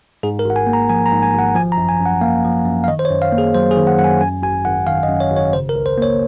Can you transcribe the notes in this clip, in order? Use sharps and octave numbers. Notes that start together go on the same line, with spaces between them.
G#2 G#4
A#4
G#1 F#5
G#5
A#3
A#5
F3 G#5
A#5
G#2
G#5
G#1 F#5
F3 G#5
A#5
F#2
G#5
F#2
F#5
A#3 F5
F3
F#2
F5
D#3 D#5
C5
C#5
F#2
F5
A#3
G#4
F#3 C5
G#4
D#3
F#5
F#2 F#5
G#5
F#2 G#5
G#1 G#5
G#1 F#5
D#3 F5
D#5
F#2
C#5
G#1 C#5
C#3 C5
A#4
C#2
C5
A#3 C#5